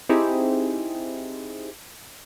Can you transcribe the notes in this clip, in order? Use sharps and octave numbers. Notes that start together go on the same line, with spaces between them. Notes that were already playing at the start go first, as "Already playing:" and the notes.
C4 D#4 E4 G4 G#4 C5